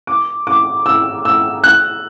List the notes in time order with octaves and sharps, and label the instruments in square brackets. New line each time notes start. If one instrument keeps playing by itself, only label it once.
[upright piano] D6
D6
E6
E6
F#6